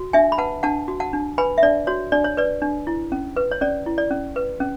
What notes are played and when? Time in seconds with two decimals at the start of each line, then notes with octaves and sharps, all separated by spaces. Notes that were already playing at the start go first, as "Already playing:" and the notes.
Already playing: F#4
0.13 D4 E5 G#5
0.32 B5
0.38 B4 F#5 A5
0.63 D4 F#5 A5
0.88 F#4
1.00 F#5 A5
1.13 D4
1.38 B4 G#5 B5
1.58 E5
1.63 D4 D5
1.87 F#4 C#5
2.12 D4 D5
2.24 C#5
2.37 B4 D5
2.62 D4
2.87 E4
3.12 C#4
3.37 B4
3.51 C#5
3.61 C#4 D5
3.86 E4
3.98 D5
4.11 C#4
4.36 B4
4.60 C#4